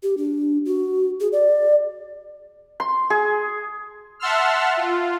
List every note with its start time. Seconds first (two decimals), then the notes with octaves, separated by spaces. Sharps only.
0.03 G4
0.17 D4
0.66 F#4
1.20 G#4
1.33 D5
2.80 C6
3.10 G#4
4.20 E5 F#5 A5 C6 E6 F6
4.77 F4